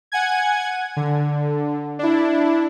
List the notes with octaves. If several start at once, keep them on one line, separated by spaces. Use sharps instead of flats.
F#5 G#5 G#6
D3
D4 E4